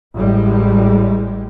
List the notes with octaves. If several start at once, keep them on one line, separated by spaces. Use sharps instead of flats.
A1 A2 G3 G#3